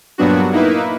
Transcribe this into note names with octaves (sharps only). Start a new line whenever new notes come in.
G2 A#2 F#3 B3 D4 F#4
A#3 D#4 E4 B4